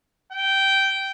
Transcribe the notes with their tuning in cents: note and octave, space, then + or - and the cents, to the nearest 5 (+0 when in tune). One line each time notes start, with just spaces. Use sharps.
G5 -10